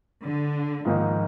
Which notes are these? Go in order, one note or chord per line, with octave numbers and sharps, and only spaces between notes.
D3
G#2 D#3 F3 A#3 D#4